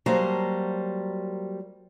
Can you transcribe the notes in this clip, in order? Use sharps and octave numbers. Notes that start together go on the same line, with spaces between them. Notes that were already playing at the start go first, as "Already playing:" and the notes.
F#3 G3 A#3 F#4 C5 A5